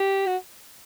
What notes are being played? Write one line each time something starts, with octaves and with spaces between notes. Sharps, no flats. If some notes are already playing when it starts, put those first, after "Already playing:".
Already playing: G4
F#4